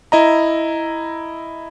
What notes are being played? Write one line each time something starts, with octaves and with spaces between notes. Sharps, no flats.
E4 D#5 A#5